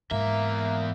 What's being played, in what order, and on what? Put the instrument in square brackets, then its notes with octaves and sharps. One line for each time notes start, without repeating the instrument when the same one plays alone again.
[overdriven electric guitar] E2 E5 [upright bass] G#2 [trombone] A#3